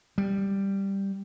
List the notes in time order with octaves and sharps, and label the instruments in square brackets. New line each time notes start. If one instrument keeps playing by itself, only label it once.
[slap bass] G3